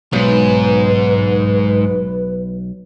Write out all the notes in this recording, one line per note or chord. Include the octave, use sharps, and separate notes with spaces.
B1 G#2 B4